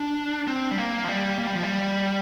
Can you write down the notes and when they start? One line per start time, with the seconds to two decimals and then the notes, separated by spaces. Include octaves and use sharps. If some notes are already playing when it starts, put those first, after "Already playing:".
Already playing: D4
0.47 C4
0.71 G3
0.78 A#3
1.04 F3
1.08 G3
1.39 A#3
1.47 G3
1.55 F3
1.63 G3